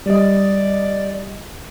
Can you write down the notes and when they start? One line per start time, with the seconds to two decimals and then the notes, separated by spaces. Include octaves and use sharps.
0.06 G3 D5 D#5